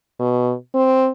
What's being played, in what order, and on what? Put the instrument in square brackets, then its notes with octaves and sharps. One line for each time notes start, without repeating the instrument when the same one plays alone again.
[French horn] B2
C4